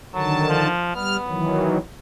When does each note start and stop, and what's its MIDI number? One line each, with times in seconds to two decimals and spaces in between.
0.14 0.68 50
0.14 0.68 51
0.14 0.47 54
0.14 0.68 81
0.49 0.95 53
0.95 1.17 55
0.95 1.82 59
0.95 1.17 89
1.28 1.78 51
1.28 1.78 52
1.28 1.78 54